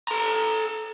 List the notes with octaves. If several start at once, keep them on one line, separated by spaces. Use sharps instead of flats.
A4 A#5